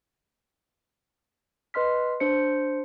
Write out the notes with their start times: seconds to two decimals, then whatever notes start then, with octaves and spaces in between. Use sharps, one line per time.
1.74 B4 D#5 C6 F6 B6
2.20 D4 C5 C#7